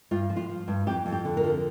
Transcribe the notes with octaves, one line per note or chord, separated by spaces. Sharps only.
G2 F4
F3
F4
F3
G2
F2 G4
F2
G4
D3
A#4
F3